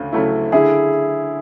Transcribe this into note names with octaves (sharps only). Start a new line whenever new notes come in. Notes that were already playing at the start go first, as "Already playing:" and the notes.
Already playing: D2 C#3 A3
C#3 F#3 A3 E4
D3 E4 G#4